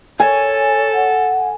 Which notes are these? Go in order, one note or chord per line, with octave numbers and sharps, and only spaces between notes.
A4 C#5 G#5
F#5